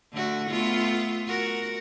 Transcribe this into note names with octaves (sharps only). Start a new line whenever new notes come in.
D3 A3 F#4
A3 B3 F4
F#4 A#4